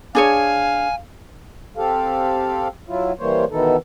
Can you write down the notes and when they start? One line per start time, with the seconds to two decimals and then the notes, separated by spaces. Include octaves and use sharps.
0.15 D4 G#4 C#5 F5 G#5
1.77 C4 G4 A4 F5
2.88 F#3 E4 F4
3.19 E3 G3 A#3 C5 C#5
3.50 B2 D#3 E3 B3 D#4 A4